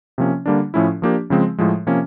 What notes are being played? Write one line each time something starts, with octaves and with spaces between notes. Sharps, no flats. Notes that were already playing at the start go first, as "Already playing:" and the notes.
C3 F3 A#3 C#4
D3 G3 A#3 D4
A2 F3 A3 C#4 E4
F3 A#3 D4 G4
C#3 F3 G#3 C4
A2 F3 G#3
C3 F3 A#3 C#4